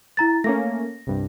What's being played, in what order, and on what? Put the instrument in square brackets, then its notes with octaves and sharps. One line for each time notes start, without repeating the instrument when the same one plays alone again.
[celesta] E4 A#5 A6
[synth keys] A3 A#3 C#4 [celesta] A#6
[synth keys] C2 G2